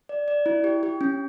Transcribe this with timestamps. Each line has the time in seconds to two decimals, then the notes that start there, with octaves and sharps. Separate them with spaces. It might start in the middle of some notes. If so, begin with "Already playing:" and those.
0.09 D5
0.28 D5
0.46 E4
0.64 G4
0.83 G4
1.01 C#4